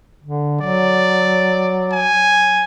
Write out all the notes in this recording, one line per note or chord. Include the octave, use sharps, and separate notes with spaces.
D3
F#3 D5
G#5